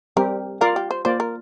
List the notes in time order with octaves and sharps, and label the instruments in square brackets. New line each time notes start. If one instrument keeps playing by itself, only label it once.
[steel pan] G3 C4 G4 [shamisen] A#4
[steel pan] F4 D5 F5 [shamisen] A#4
[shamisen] G4
C5
[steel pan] A#3 F4 D5 [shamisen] C5
[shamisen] A#4